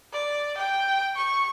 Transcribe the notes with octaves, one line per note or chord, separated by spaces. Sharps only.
D5
G5
C#6